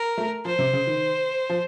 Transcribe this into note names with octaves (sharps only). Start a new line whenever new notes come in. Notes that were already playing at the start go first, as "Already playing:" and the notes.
Already playing: A#4
A3
F3 C5
C3
C#3
D#3
F3